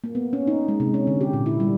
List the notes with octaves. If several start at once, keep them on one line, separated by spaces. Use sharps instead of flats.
A#3
B3
C#4
D#4
G#3
C3
C#4
D3
G4
A#2
E4
G3